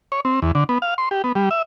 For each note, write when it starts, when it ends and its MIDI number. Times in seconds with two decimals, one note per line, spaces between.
0.12 0.20 73
0.25 0.40 60
0.42 0.52 40
0.55 0.64 50
0.69 0.78 59
0.82 0.94 77
0.98 1.09 84
1.11 1.22 67
1.24 1.32 59
1.35 1.49 55
1.51 1.62 76